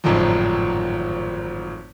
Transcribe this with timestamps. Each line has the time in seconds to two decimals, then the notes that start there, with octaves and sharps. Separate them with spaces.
0.04 G#1 F#2 A2 D3 D#3 F3